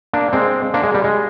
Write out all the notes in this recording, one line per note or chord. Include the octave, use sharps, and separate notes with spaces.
A#3 D4
G#3 C4
A#3 D4
G#3
G3
G#3